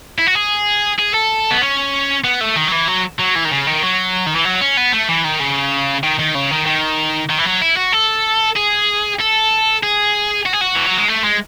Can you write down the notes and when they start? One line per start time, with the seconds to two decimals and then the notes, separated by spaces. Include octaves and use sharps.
0.18 E4
0.27 F#4
0.35 G#4
0.99 G#4
1.14 A4
1.51 B3
1.62 C#4
2.24 B3
2.41 A3
2.56 D#3
2.68 F#3
2.72 E3
2.88 F#3
3.19 F#3
3.35 E3
3.44 D#3
3.50 C#3
3.67 D#3
3.82 F#3
4.27 D#3
4.35 E3
4.45 F#3
4.61 C#4
4.77 B3
4.92 A3
5.09 E3
5.24 D#3
5.40 C#3
6.04 D#3
6.19 D#3
6.35 C#3
6.51 D#3
6.66 D#3
7.30 D#3
7.38 E3
7.45 F#3
7.62 E4
7.77 F#4
7.93 A4
8.56 G#4
9.20 A4
9.83 G#4
10.46 F#4
10.53 G#4
10.61 F#4
10.75 E3
10.86 F#3
10.97 G#3
11.08 A3
11.24 G#3